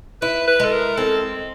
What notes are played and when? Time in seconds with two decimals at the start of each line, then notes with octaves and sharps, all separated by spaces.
0.22 E4 B4
0.47 B4
0.60 G#3 A4
0.72 A#4
0.97 C4 A4